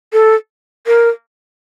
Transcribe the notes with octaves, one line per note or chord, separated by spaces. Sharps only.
A4
A#4